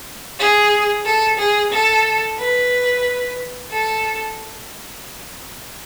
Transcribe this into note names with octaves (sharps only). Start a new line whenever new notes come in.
G#4
A4
G#4
A4
B4
A4